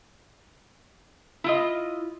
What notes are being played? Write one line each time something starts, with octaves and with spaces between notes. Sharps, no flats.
E4 F4 D#5